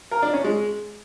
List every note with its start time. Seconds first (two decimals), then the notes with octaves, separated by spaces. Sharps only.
0.11 A#4
0.22 D4
0.33 C#4
0.44 G#3